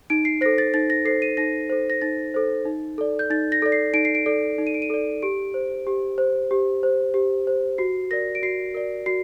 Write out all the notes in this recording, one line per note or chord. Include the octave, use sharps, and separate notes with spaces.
D#4 D7
C7
A4 C5 A#6
A6
D#4 A6
A#6
A4 C5 C7
D#7
D#4 A#6
A4 C5
A#6
D#4 A6
A4 C5
D#4
A4 D5
G6
D#4 A6
A#6
A4 D5
C7
D#4 D7
C7
D7
A4 D5
D#4
D#7
D7
D#7
A4 D5
G4 D7
C5
G4
C5
G4
C5
G4
C5
F#4 C7
A#4 D5 A#6
D7
F#4 C7
A#4 D5
F#4 C7